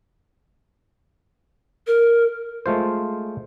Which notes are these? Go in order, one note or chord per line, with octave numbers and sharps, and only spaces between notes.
A#4
G#3 A3 F4 C5